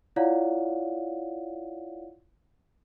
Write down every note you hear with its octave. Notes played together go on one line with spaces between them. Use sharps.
E4 F4 C#5 D5 F5 F#5